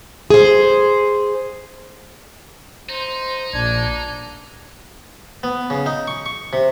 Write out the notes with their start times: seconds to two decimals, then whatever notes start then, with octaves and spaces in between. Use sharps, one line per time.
0.30 G#4 C5
2.89 D#4 C5
3.54 A#1 D4 G#6
5.43 B3
5.70 C#3
5.86 D#4
6.07 C#6
6.26 C#6
6.53 C3